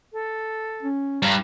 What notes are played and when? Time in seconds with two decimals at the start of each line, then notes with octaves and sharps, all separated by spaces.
0.13 A4
0.83 C#4
1.22 G2 A#5